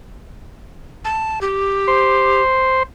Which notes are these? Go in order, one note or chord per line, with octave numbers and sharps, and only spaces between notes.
A5
G4
C5